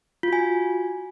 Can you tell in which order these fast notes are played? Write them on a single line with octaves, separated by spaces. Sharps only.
F4 F#4 G#5